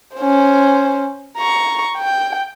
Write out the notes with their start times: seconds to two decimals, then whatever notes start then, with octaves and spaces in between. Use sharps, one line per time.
0.16 C#4 C5
1.38 A#5 C#6
1.98 G5